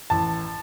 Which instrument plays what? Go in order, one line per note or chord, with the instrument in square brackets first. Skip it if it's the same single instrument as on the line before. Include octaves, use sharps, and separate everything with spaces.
[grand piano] A1 A5